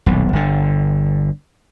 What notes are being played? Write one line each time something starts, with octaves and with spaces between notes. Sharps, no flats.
D#1 B1
G1 D3